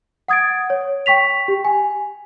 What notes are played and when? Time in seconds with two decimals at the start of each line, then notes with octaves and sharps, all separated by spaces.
0.28 F#5 D#6 G#6 A6 D7
0.70 C#5
1.06 G5 C#6 B6 F7
1.48 G4
1.65 G#5